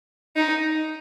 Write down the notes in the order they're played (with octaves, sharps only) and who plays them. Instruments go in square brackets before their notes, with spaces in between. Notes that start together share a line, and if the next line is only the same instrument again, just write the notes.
[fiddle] D#4